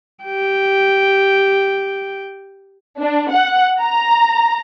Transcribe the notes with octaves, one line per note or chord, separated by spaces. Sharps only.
G4 G5
D4
F#5
A#5